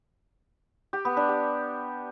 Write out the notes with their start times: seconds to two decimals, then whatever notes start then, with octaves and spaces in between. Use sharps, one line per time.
0.93 G4
1.05 B3
1.17 D4
1.29 G4